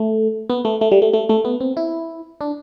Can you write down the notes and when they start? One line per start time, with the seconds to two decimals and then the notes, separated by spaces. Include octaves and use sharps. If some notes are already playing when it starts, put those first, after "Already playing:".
Already playing: A3
0.50 B3
0.65 A3
0.81 A3
0.92 G3
1.02 A3
1.13 A3
1.29 A3
1.45 B3
1.61 C4
1.77 E4
2.41 D4